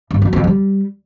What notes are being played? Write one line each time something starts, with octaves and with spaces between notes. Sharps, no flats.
G2
F#3
F2
G3